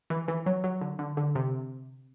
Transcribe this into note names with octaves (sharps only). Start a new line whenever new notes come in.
E3
E3
F#3
F#3
D3
D3
D3
C3